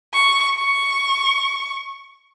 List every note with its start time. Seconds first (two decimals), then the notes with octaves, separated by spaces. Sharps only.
0.14 C#6
0.55 C#6